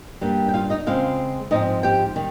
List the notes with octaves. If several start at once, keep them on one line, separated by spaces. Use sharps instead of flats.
G2 G3 A#3
G5
F4 F5
D#4 D#5
C#3 G#3 C4 F4 F5
G#2 F3 C4 D#4 D#5
G4 G5
D#3 G3